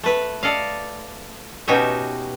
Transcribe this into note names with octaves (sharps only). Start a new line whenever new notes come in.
A3 B4
A4 D5 D#5 F5
B2 C#4 D#4 F#4 G4 E5